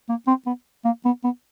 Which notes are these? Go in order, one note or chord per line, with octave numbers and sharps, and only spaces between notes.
A#3
C4
B3
A#3
B3
B3